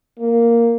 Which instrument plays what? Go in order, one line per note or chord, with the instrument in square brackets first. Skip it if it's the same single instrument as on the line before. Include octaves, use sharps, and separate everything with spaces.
[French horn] A#3